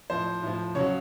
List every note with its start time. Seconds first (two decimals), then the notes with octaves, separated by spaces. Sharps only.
0.10 A2 F3 C5
0.43 A2 F3
0.75 C#3 F#3 C#5